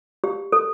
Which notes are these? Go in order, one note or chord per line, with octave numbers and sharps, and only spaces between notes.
G4
A4